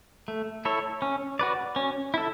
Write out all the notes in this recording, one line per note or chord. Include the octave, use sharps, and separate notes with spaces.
A3
E4 A4 C#5
C#4
F#4 B4 D5
C#4
E4 A4